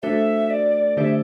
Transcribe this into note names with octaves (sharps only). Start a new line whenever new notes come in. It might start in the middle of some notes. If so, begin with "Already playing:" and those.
A3 D4 F#4 A4 C5 E5
D5
D3 A3 D4 G4 C5 E5